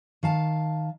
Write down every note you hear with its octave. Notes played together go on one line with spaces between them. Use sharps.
D#3 F5 A5